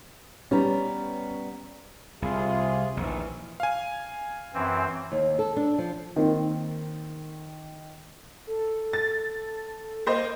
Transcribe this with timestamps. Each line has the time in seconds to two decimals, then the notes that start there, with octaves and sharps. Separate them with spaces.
0.51 G3 B3 C#4 A#5
2.22 C2 C3 F4 G#4
2.97 A#1 D#2 E3
3.60 F5 G#5
4.54 F#2 E3 C4
5.12 D#2
5.39 A4
5.56 D4
5.78 F3
6.16 D#3 A#3 C4
8.47 A4
8.93 A6
10.07 A#3 C5 D#5